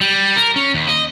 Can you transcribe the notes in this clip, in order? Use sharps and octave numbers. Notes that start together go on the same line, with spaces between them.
G3
A#4
C#4
D#2
D#5